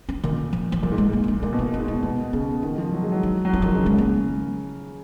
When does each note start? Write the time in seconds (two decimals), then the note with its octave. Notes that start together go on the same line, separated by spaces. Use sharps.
0.09 C#4
0.24 A#2 D#3
0.53 F3
0.72 F3
0.83 A#2 F#3
0.92 G#2
0.98 G#3
1.07 G#2
1.13 A#3
1.24 D#4
1.28 C#4
1.43 A#2 D#4
1.53 B2
1.59 D#4
1.62 A#2
1.74 C#4
1.80 G#2
1.88 B3
1.91 A#2
2.03 B2 A#3
2.33 C#3 B3
2.63 D#3 C#4
2.78 F3
2.92 F#3
3.03 G#3
3.12 F#3
3.23 D#4
3.45 F#3
3.53 F3 C#4
3.62 D#3 D#4
3.73 C#3
3.83 C#3 G#3
3.98 A#3